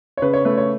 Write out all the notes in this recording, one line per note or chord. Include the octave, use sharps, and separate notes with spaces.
C#5
C#3 B4
C#5
A3 B4
C#5